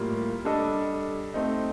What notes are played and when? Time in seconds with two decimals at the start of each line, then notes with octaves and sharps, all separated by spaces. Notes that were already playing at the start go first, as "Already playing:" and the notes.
Already playing: A2 G3 A#3 F4 A#4
0.45 G3 D4 A4 D#5
1.34 A3 C4 D#4